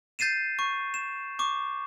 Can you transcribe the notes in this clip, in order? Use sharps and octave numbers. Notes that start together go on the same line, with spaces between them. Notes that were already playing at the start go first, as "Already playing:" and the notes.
G6 A6 C7 D#7 E7
C#6
E7
C#6 D6